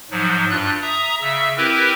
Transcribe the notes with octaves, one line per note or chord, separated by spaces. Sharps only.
G#2 F3 F#3
G2 F4 F#6
E5 A#5 D#6
C#3 E5 E6
C4 E4 G4 A#4 B4